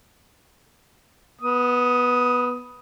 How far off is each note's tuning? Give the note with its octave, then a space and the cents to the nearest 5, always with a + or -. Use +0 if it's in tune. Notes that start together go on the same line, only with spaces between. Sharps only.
B3 -10 D#6 +10